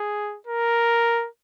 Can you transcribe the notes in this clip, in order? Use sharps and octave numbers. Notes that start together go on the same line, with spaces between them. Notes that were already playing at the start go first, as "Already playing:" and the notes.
Already playing: G#4
A#4